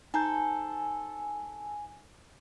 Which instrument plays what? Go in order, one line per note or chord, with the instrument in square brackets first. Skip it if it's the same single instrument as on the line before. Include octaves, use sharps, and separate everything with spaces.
[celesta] D#4 A#5 G6 [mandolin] A4 C5 [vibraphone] G#5